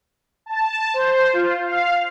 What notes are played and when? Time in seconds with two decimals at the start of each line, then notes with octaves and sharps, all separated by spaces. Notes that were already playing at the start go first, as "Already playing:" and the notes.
0.46 A5
0.94 C5
1.33 F4
1.65 F5